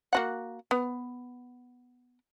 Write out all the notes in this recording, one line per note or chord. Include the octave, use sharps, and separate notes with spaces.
A#3 F#4 F#5
B3